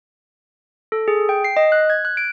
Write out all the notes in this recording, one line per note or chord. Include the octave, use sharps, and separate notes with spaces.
A4
G#4
G5
C7
D#5
F#6
G#6
F#6
D7